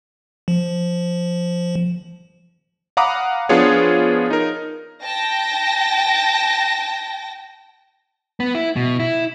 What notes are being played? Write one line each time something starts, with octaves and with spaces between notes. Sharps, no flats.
F3
F5 F#5 A#5 B5 D6 D#6
F3 B3 D4 F4 G#4 C#5
D#4 A#4
G5 A5 A#6
B3
E4
B2
E4